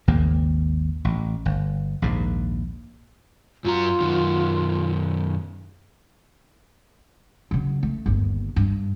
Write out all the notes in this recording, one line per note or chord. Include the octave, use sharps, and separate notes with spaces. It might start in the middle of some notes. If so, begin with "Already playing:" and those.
G#1 D#2 C#3 A#3
A1
G1
A#1 D#2 G#2
F#2 F#3 F4 A#5
F#2 D#3
C#3 F#3
A3
G1 D#2
G2